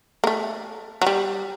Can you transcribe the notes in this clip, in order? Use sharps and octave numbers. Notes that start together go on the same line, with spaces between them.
A#3
A3
F#3
G3